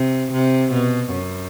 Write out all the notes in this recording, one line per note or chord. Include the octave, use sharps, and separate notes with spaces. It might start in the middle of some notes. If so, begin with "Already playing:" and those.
Already playing: C3
C3
B2
F#2